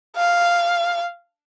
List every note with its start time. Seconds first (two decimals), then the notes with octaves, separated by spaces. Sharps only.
0.16 F5